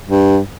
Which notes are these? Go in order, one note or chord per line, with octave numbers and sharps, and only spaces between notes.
G2